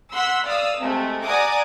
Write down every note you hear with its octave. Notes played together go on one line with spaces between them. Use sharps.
F#5 C6 E6 B6
D5 F5 D#6 E6
C3 G#3 A3
D5 F#5 G#5 A#5 D6 D#6